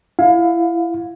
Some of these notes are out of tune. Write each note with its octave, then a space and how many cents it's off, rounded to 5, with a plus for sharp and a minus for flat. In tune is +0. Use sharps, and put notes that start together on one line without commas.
E4 +25 F5 +25